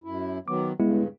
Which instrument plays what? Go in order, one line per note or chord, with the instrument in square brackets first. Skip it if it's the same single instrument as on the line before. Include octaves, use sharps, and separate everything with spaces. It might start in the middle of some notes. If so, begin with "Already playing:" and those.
[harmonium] F#2 E4
[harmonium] D#3 F#3 B3 [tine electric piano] D6
[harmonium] G2 C#3 [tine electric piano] G#3 B3 E4